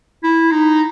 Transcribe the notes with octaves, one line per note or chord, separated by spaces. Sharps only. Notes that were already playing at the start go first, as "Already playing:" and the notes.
E4
D#4